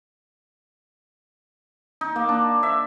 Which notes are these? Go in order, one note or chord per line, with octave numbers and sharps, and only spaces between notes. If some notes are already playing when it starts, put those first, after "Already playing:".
D#4
A#3
D4
E5